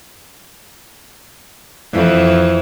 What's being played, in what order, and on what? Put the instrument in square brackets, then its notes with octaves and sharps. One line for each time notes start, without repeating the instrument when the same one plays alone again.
[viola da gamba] F2 E3